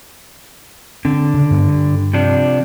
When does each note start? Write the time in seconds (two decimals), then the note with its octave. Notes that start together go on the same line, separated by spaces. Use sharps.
1.05 D3 C4
1.34 C#3
1.50 G2 B3
1.68 G2
2.13 C3 F3 D4